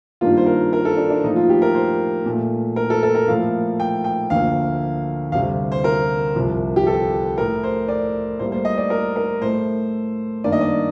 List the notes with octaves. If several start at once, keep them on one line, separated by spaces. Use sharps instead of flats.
G2 D#3 G3 A#3 F4
C5
A#4
A#4
A4
D4
D4
A2 F3 A#3 D#4
F4
G4
A#4
C5
A#2 A3
A#4
A4
A4
A#4
A2 F3 A#3 F5
G5
G5
D2 D3 F3 A#3 F5
D2 C3 G3 F5
C5
A#4
C2 C3 F3
G4
A4
A2 A3 A#4
C5
D5
A2 G3 A#3 C5
C5
D#5
D5
A#4
A#4
A2 A3 C5
G2 D#3 A#3 D5
D#5
D5